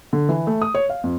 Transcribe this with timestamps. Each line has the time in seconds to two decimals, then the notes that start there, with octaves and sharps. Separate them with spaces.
0.13 D3
0.29 E3
0.47 A3
0.62 D#6
0.75 C#5
0.90 F5
1.04 F2